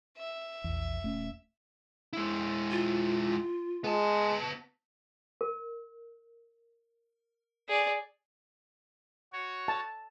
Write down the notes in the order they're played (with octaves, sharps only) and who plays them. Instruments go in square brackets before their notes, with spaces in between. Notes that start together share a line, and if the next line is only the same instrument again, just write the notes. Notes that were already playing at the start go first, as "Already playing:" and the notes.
[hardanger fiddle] E5
[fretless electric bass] A#1 E2
D#1 A3 C#4
[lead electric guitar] G#3 E4
[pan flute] F4
[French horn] G#3 [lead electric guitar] B3 A5
[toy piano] A#4
[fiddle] G#4 D5
[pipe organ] F#4 C#5
[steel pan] A5